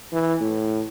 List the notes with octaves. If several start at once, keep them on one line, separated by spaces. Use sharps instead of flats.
E3
A2